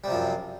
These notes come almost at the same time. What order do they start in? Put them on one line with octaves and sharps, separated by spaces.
G3 C3 F3 F#2